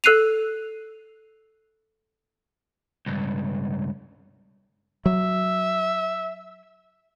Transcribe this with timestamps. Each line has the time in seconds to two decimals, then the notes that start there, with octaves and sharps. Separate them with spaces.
0.04 A4 E6 F#6 C7 D#7 F7
3.06 C#2 G2
5.06 F#3 E5